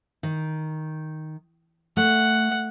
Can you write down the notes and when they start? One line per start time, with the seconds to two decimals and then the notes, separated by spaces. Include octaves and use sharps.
0.23 D#3
1.97 A3 F#5